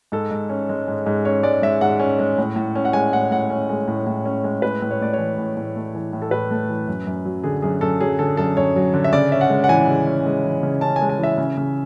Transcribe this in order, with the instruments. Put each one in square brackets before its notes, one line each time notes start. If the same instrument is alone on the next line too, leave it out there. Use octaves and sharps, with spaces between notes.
[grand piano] G#2 A4
G#2
C#4
G#3
G#2
G#2
C#4 C#5
G#3 D5
G#2 E5
G#2 F#5
C#4
G#3
A2
A2
C#4
F#5
G#3 G#5
A2 F#5
A2 F#5
C#4
G#3
A2
A2
C#4
G#3
A2 B4
A2
C#5
A3 D5
C#5
E3
A2
A2
A3
E3
A2
A4
A2 B4
A3
E3
F#2
F#2
F#3
D3 G#4
F#2 G#4
F#2 A4
F#3 G#4
D3 A4
F#2 A4
F#2 C#5
F#3
D3
E5
C#3 D5
C#4 E5
F#5
G#3
F#5
E3 G#5
C#3
C#4
G#3
E3
C#3
C#4 A5
G#5
G#3
G#5
E3 E5
C#3
C#3